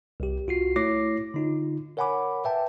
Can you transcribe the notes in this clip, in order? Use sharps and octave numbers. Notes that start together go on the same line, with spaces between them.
C2 G4
C2 F4 F#4 C7
A3 E4 C#5 D6 A#6 C7
D3 D#4 F4
A#4 C#5 F#5 G#5 B5 D6
B4 E5 G5 A5